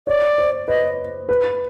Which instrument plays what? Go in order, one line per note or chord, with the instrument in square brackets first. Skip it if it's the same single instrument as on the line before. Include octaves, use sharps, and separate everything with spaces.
[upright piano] C#5 [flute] D5
[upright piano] C5
[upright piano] B4 [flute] D#5
[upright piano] B4